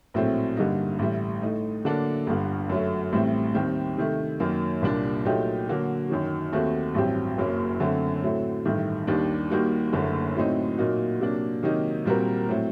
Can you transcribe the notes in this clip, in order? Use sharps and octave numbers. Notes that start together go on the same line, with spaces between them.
A#1 A2 F#3 A3 C4
G2 D3 G3 A#3 D#4
A1 A2 G3
A2 A3 D#4
D3 F#3 A#3 D4 A4
G1 G2 D3
F#2 F#3 A3
A1 A2 G3 C4
D#2 D#3 G3 C4 G4
C3 D#3 A3
F#2 D#3 F#3 A#3
C2 A#2 G3 A#3 D4
A#2 F#3 A3 D#4 G4
D3 F#3 A#3 F#4
F#2 D#3 F#3
D#2 D#3 A3 C4 F#4
A1 G2 F#3 C4 G4
F#1 F#2 F#3 A#3
F#2 D3 A3 C4
A2 F#3 A3 C4
A1 G2 D#3 A3
D#2 D#3 G3 D4
D#2 D#3 G3 A#3 F#4
F#1 F#2 D3 A3
A2 F#3 C4 D#4
A#2 F#3 A#3 D#4 F#4
C3 F#3 A#3 D4
C3 D#3 F#3 A#3 D#4
A#2 G3 C4 F#4 A#4
A2 F#3 C4